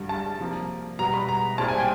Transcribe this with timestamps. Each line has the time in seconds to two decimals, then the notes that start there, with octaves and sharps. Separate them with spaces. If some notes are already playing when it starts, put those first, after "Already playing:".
Already playing: G2 D3 G3
0.09 A5
0.39 C3 F3 A#3
0.99 B2 G3 B3 A#5
1.14 B5
1.29 A#5
1.58 C2 A#2 G3 C4 A5
1.68 G#5
1.78 G5